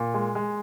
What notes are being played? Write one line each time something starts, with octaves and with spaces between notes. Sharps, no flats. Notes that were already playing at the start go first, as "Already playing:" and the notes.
Already playing: A#2
G#3
G#3